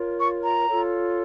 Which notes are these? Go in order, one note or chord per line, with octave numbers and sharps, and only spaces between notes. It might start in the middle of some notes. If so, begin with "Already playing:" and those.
Already playing: F4 A#4 C#5
C#6
A#5
F4 A4 C#5